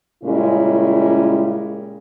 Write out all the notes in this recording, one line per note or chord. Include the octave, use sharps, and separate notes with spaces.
A#2 C#3 G3 G#3 C#4 E4